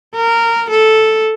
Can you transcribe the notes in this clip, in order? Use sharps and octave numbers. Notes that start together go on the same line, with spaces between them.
A#4
A4